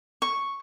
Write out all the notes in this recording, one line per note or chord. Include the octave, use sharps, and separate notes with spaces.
C#6